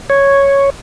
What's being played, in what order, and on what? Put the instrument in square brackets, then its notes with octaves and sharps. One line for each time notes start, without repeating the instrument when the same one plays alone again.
[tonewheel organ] C#5